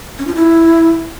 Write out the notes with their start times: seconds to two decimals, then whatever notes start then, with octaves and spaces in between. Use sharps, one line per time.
0.19 C#4
0.27 F4
0.35 E4